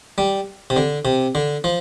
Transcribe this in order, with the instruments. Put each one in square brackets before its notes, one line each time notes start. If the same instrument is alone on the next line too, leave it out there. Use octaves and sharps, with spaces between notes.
[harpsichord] G3
C3
D3
C3
D3
F3